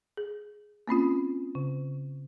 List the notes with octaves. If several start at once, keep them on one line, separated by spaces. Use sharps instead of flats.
G#4
A#3 C4 C#4 F4
C#3